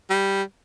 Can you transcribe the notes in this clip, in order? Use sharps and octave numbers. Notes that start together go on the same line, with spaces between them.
G3